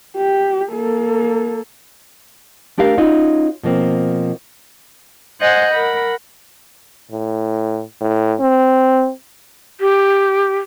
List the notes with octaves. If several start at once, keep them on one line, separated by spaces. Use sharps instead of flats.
G4
A#3 A4
A3 D4 G4 A#4 F5
C#4 D#4 F4 F#4
B2 F3 A#3 C4
C5 D#5 F#5 G#5 F#6 G6
A#4 F#5 B5
A2
A2
C4
G4